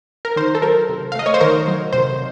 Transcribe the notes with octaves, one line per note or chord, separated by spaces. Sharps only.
A#4
D#3 C5
A4
F#3 A#4
C3
F5
A3 D#5
C#5
C5
D#3 A#4
F#3
C3 C5